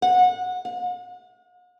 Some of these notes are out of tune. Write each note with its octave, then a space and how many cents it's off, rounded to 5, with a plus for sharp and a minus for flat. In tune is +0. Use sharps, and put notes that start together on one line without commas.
F#5 -20
F#5 -45